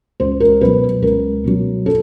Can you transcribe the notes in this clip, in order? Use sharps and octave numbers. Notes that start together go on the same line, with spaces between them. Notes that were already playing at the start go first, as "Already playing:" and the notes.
C#2 C5
A#4
B2 F#3 B4
C#2 A#4
B2 F#3
A4